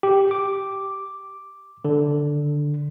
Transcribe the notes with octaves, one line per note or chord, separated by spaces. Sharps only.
G4
D6
D3